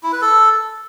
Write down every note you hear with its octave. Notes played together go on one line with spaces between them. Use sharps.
E4
B4
A4